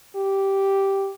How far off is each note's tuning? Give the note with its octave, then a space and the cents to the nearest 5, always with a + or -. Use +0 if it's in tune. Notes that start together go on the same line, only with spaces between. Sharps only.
G4 -5